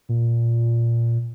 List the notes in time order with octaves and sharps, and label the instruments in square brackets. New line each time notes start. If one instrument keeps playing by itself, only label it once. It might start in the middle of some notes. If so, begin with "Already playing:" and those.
[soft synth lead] A#2